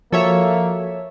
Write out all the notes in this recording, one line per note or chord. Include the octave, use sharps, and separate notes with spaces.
F3 A#3 F#4 A4 C#5 E5